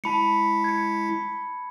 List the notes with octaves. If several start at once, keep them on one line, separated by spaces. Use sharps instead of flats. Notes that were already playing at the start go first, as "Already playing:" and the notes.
G#3 E4 A5 B5 B6 C#7
G#6 C#7